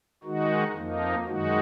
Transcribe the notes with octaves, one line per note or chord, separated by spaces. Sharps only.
D#3 G#3 D#4 F#4
F2 F3 A#3 D#4
F#2 D#3 G#3 D#4 F#4